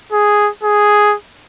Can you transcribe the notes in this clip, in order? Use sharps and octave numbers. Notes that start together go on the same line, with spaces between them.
G#4
G#4